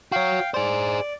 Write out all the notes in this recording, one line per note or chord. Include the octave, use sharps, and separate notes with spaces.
F#4 C#5 F5 G5
G#4 C5 D5